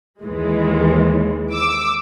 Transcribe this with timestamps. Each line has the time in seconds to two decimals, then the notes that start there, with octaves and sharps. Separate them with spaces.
0.21 D#2 E3 G#3
1.52 D6 E6